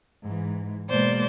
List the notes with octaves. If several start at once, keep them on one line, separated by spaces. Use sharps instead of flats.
G#2 E3
B2 G#3 A#3 C5 D5